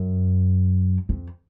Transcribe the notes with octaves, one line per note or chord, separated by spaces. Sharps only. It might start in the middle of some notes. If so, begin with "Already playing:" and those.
Already playing: F#2
F2